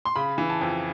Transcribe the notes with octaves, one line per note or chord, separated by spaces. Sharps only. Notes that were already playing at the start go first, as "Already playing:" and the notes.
C6
C#3 B5
E3
A5
F2